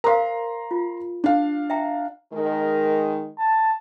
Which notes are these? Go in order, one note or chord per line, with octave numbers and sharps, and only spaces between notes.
A#4 C5 F5 A#5 C6
F4
D4 F5
E5 G5 A#5
D#3 G#3 A#4
A5